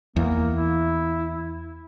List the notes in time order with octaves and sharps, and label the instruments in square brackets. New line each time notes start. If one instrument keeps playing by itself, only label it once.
[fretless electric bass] E2 [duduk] A#3
[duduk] E4